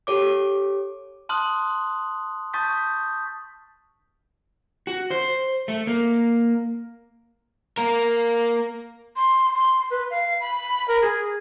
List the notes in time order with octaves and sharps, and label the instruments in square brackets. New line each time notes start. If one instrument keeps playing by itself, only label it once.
[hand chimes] G4 A4 C#5 D6
[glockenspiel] A5 C6 D#6 F6 F#6 F#7
A5 C#6 D#6 G6 A6 B6
[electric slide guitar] F#4
C5
A3
A#3
[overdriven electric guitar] A#3 A#4
[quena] C6
C6
B4
F5
B5
A#4
G#4